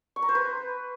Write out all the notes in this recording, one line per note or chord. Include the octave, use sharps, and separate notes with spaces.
C#6
A#5
C5
B4